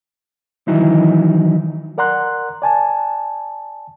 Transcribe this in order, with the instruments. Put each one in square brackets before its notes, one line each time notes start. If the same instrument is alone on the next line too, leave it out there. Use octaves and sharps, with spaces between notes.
[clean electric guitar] D#3 E3 F#3 D#4 E4
[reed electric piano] A#4 D5 F#5 A#5 C6 F#6
D5 G#5 A5